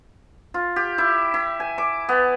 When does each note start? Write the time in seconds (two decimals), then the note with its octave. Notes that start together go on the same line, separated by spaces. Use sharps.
0.54 F4
0.76 G4
0.98 E4
1.34 E4
1.60 G#5
1.78 D6
2.09 B3